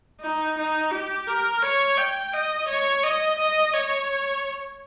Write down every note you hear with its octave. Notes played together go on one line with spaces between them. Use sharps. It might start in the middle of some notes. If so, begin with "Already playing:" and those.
D#4
D#4
G4
A#4
C#5
G5
D#5
C#5
D#5
D#5
C#5